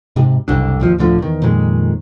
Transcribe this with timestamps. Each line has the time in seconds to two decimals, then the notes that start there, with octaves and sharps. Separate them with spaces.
0.16 G#2 C3
0.48 F#1 C2 D3 D4
0.80 G#1 D#2 F3
0.98 D2 A2 D3 F3
1.19 E2 D#3
1.42 F2 A#2 D#3 G#3